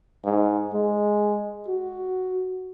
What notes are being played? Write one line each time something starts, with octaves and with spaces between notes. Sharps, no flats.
G#2
G#3
F#4